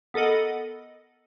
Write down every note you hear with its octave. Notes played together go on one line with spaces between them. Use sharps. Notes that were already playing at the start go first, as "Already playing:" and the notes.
B3 A4 A#4 D#5 F#5